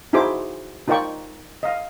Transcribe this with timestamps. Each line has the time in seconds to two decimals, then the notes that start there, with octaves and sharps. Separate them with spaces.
0.13 D#4 E4 F#4 G#4 C5 D6
0.88 D#4 F4 A#4 D5 G5 C#6
1.63 D#5 F5